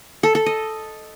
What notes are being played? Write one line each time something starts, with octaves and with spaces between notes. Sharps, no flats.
A4
A4
D#5